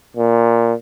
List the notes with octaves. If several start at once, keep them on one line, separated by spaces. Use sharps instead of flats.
A#2